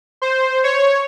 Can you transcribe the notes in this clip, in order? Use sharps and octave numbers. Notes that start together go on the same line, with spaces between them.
C5
C#5